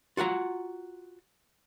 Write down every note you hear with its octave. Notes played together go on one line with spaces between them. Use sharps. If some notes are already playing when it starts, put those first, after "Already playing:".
F4 F#4 F#5 A#5